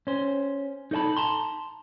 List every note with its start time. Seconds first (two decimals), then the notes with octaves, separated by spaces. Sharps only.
0.07 C#4 C5
0.91 D#4 A4 D5 A5 B5
1.17 A5 A#5 C6